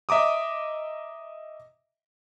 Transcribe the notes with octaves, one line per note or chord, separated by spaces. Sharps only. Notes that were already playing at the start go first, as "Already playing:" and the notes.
D#5 E5 A#5 D6 D#6